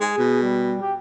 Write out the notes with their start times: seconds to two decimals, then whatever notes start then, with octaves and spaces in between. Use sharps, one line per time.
0.01 G#3 G#4
0.18 B2
0.43 G3
0.82 G4